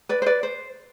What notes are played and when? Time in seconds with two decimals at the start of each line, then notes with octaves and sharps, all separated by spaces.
0.09 B4 D5
0.22 C5
0.26 B4 D5
0.43 C5